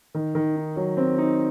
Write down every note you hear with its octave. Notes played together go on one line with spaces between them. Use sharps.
D#3
D#3
D#4
F#3
C4
D#4